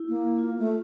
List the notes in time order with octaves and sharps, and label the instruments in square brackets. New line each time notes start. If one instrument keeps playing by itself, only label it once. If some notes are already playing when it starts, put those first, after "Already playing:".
Already playing: [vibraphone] E4
[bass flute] A#3
[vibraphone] F4
[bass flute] A3